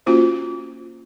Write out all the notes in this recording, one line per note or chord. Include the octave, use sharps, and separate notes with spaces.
A#3 C#4 F4 F#4 C5